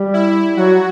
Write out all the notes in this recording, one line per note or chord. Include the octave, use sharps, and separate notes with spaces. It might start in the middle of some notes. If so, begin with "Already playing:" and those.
Already playing: G3
E4
F#3 F#4